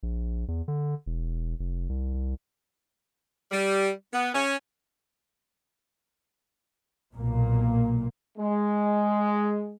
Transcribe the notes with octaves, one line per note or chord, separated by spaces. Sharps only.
A#1
E2
D3
E1
F1
C2
C2
G3
B3
C#4
B1 A#2 A#3
G#3